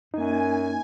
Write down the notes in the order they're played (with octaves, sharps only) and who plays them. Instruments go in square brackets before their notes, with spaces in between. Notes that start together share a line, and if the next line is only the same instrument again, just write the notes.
[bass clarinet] F#2 [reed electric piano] A#3 D#4 [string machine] G#5